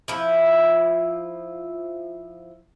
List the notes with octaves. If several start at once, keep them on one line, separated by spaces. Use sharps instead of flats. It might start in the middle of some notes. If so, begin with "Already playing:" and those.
F3 E4